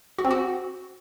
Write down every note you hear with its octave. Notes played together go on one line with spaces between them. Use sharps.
F#4
C4
F#4